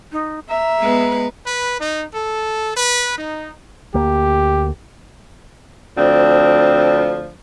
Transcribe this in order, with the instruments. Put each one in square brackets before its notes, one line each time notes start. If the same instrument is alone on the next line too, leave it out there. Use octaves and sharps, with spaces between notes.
[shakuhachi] D#4
[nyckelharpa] E5 [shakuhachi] A#5
[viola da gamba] G#3 B3 B4
[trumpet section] B4
D#4
A4
B4
D#4
[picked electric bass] D2 A#3 [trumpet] G4
[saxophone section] D2 F3 C4 D4